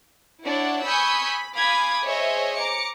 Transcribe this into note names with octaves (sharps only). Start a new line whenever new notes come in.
D4 E4 C#5 D5 F#5
G#5 B5 C#6 D#6 E6 G6
B5
F5 G#5 B5 D6 D#6 G#6
G#4 C5 C#5 D#5 E5
A#5 D6 C#7